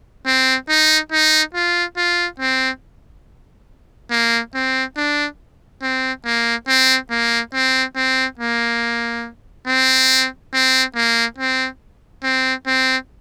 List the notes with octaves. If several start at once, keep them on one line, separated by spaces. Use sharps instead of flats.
C4
D#4
D#4
F4
F4
C4
A#3
C4
D4
C4
A#3
C4
A#3
C4
C4
A#3
C4
C4
A#3
C4
C4
C4